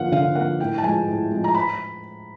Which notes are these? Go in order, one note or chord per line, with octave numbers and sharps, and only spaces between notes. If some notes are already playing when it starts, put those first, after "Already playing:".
Already playing: D3 F3 A#3 F5 F#5
D3 F5
F3 A#3 F#5
A2 G5
A5
F3 G#3 G#5
A2
F3 G#3
A#5
B5